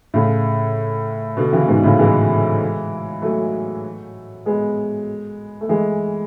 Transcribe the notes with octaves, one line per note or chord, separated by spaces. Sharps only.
A2 C#3
B2 D3
C#3 E3
G#2 B2
A2 C#3
E3 G#3
F#3 A3
G#3 B3
A3
E3 G#3